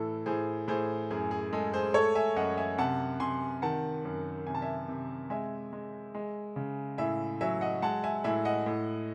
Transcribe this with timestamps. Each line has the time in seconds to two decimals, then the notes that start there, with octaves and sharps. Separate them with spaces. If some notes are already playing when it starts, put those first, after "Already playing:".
Already playing: A2 E3 A4
0.26 A2 G#4 C5
0.68 A2 G#4 C5
1.10 F#2 G#4
1.31 G#4
1.53 G#3 A4
1.73 G#4 C5
1.94 A3 A4 C#5
2.15 E5 G#5
2.36 F#2 D#5 F#5
2.57 E5 G#5
2.78 C3 F#5 A5
3.20 C3 G#5 C6
3.62 D#3 F#5 A5
4.05 F#2
4.47 C3 G#5
4.55 A5
4.62 E5 G#5
4.89 C3
5.30 G#3 E5 G#5
5.73 G#3
6.15 G#3
6.56 C#3
6.98 A2 E5 G#5
7.41 F#3 E5 G#5
7.61 D#5 F#5
7.82 G#3 F#5 A5
8.03 E5 G#5
8.24 A2 E5 G#5
8.45 D#5 F#5
8.66 A2